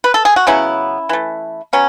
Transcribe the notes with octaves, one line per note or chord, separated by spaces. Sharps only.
B4
A4
G#4
F#4
C#3 F#3 B3 C#4 E4
E3 A3
F#3 B3 C#4